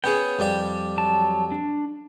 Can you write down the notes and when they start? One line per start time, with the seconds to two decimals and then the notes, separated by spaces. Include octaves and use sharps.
0.04 B3 C#4 G#4 G5
0.39 F2 G3 G4
0.98 F#3 A5
1.52 D4